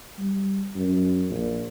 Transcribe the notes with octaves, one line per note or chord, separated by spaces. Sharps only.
G3
F#2
A#1